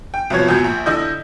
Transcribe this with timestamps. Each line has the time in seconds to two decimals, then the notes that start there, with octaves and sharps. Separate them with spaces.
0.14 G5
0.30 C2 F3 F#3 B3 C#5 G#6
0.48 C#2 F#2 B2 G6
0.64 A#1
0.86 D3 E4 D#5 G6